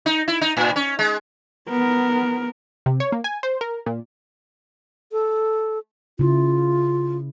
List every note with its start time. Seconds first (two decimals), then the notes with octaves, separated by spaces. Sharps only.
0.06 D#4
0.28 E4
0.41 D#4
0.57 A2
0.76 C#4
0.99 G#3
1.69 B3 A#4
2.86 C3
3.00 C#5
3.12 A#3
3.24 G#5
3.43 C5
3.61 A#4
3.86 A#2
5.12 A4
6.19 C#3 E4 F4